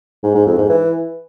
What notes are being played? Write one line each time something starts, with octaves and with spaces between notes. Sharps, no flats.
G#2
G#2
F2
G#2
E3